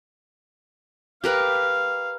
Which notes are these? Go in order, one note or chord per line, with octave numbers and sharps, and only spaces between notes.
G4 A#4 B4 F5